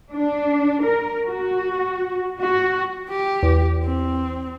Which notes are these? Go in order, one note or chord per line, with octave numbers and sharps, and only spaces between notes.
D4
A#4
F#4
F#4
G4
E2
C4